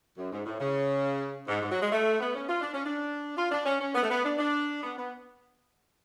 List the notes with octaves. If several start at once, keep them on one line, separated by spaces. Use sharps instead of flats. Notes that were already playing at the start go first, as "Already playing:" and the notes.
F#2
G#2
A2
C#3
G#2
G#2
F#3
G#3
A3
B3
C#4
F4
D4
C#4
D4
F4
D4
C#4
C#4
B3
A3
B3
D4
D4
B3
B3